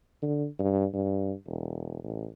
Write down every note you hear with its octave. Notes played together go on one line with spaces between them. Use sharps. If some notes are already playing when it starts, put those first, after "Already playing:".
D3
G2
G2
E1
A1